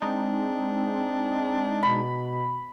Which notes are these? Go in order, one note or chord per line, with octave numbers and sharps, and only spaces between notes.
G#3 C4 D4 D#4
B2 B5